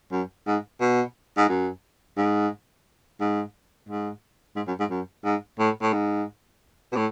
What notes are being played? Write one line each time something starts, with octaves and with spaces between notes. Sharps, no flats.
F#2
G#2
B2
G#2
F#2
G#2
G#2
G#2
G#2
F#2
G#2
F#2
G#2
A2
A2
G#2
B2
A2